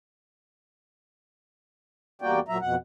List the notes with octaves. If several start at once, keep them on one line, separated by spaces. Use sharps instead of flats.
E2 G3 A#3 F#4 D5 G5
A#2 F#3 E5 A#5
F2 B2 F#5